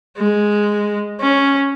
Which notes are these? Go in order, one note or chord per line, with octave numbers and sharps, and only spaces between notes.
G#3
C#4